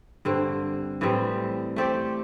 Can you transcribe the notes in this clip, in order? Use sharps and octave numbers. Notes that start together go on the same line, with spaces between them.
G2 D3 C4
A2 E3 G3 C4
A3 C4 G4 D5